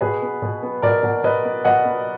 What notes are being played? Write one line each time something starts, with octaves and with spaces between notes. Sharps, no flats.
B2 G#4 B4
B3
B2
B3
B2 A#4 D5
B2
B2 B4 D#5
B3
B2 D#5 F#5
B3